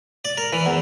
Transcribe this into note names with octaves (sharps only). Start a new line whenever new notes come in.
D5
A#4
E3
E2